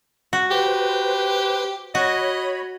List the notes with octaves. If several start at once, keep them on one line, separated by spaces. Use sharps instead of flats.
F#4
G4 B4 C5
F#4 C#5 D#5 B5